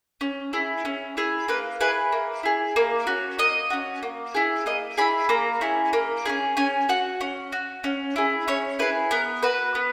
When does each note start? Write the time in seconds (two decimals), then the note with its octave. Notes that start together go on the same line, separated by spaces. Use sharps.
0.21 C#4
0.53 E4 G#4
0.85 C#4
1.17 E4 G#4
1.48 A#3 B4
1.81 E4 G#4 B4
2.12 A#3
2.43 E4 G#4
2.76 A#3
3.07 C#4 F#4
3.39 A#3 D#5
3.70 C#4 F#4
4.03 A#3
4.35 E4 G#4
4.66 A#3 D#5
4.97 E4 G#4 B5
5.29 A#3 A#5
5.61 C#4 E4 G#4
5.93 A#3
6.25 E4 G#4
6.29 C#4
6.57 C#4 G#5
6.89 F#4 F#5
7.21 C#4
7.52 F#4
7.84 C#4
8.16 E4 G#4
8.48 C#4 C#5
8.79 E4 G#4 B4
9.11 B3 A#4
9.43 F#4 B4
9.75 B3